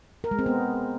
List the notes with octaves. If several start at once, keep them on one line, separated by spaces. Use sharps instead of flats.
A#4
G#3
C4
B3